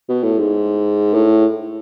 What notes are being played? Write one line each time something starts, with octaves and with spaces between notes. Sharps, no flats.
B2
A2
G#2
A2